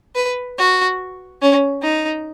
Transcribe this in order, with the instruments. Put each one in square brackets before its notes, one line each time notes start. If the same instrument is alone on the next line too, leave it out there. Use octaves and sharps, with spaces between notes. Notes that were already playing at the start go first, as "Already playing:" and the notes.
[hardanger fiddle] B4
F#4
C#4
D#4